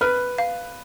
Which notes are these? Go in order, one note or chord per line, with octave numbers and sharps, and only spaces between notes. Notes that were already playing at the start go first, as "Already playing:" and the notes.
B4 F6
F5